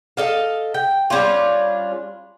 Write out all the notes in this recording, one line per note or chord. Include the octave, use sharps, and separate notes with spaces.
A4 D#5 F5
G5
G3 C#4 D4 F4